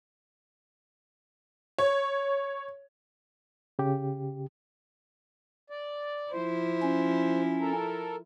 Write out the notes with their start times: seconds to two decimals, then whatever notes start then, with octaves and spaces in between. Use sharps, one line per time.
1.78 C#5
3.79 C#3 G4
5.70 D5
6.32 F3 E4 C5
6.82 C#4
7.60 A4 A#4